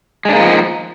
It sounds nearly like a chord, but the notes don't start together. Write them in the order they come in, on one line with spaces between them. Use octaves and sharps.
G#3 D4 A#3 D#4 F3